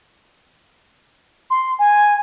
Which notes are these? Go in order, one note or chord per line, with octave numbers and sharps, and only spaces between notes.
C6
G#5